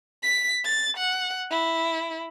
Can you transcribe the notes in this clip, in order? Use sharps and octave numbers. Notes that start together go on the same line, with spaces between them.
B6
A6
F#5
E4